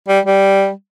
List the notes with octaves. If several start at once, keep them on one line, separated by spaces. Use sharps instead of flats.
G3
G3